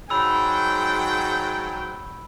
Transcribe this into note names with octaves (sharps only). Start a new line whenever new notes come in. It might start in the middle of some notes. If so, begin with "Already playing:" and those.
G#2 F#3 G5 B5 E6